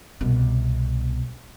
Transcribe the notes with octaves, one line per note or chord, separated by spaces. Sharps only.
C2 B2